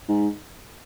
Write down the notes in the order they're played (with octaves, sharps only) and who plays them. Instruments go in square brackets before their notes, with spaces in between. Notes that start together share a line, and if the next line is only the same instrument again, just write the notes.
[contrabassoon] G#2